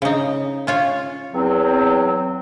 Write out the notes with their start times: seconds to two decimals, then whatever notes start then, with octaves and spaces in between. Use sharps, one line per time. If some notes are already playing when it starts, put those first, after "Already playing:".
0.02 C#3 D#4
0.67 C#4 F4 C#5
1.35 E2 F#3 C4